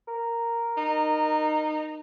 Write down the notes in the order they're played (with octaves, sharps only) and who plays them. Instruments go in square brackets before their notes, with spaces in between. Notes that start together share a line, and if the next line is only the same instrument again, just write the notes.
[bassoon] A#4
[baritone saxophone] D#4